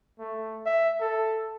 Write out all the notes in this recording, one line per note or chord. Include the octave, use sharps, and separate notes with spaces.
A3
E5
A4